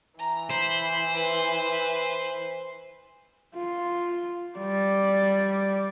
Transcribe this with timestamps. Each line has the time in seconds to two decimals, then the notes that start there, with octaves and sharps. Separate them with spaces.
0.19 E3 A#5
0.51 C5 B5
1.15 B4
3.56 F4
4.58 G3 D5